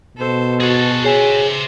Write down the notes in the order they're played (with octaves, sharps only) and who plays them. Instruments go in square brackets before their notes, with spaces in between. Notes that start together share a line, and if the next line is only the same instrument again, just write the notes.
[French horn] B2 [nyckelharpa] A4 C5
[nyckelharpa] F#4 [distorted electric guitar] G#4 A4
[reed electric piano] G#4 C#5 G#5 [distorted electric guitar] C5 E5